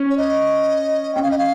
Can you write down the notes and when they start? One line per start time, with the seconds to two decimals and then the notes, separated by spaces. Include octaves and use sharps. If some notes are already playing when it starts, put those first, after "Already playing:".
Already playing: C#4
0.10 C#5
0.18 D#5
1.15 C#4 G5
1.23 F5
1.31 D#5
1.38 F5